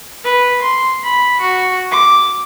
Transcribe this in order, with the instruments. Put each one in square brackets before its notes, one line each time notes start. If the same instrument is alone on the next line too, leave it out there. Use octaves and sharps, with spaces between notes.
[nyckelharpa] B4
C6
B5
F#4
D6